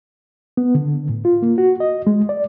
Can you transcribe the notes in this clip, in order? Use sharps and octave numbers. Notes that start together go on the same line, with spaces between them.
B3
D3
A2
F4
A#3
F#4
D#5
G#3
D5